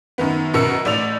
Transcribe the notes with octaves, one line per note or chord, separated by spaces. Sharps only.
F#2 D#3 B3
F#2 B2 A#4 E6 C#7
A1 A3 D5 E6 F7